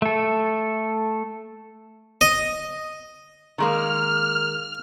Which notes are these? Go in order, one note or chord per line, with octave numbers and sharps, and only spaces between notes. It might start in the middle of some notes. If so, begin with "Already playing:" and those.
A3 A4
D#5
D#3 G#3 A#3 F6